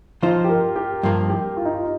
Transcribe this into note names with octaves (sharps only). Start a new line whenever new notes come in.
F3 D#4 F4 C5
G4
A#4
G4
G2 F3 A#3
G4
F4
D#4
F4